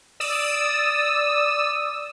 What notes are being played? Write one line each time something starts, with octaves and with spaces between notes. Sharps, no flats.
D5 D#6 E6